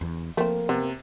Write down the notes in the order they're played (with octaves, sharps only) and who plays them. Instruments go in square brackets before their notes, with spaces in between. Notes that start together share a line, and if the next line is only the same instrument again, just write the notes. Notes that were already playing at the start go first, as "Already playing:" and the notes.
[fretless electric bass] E2
[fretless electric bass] F3 [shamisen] A3 C4 [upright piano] A#3
[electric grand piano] C3 [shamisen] B3